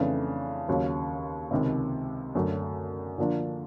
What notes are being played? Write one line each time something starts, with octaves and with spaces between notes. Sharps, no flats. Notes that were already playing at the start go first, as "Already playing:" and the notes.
Already playing: F2 C#3 E3 A3 D4
D#2 C#3 F#3
C#2 C3 D#3
F#2 D3 F#3 A3
D3 F3 A#3 D4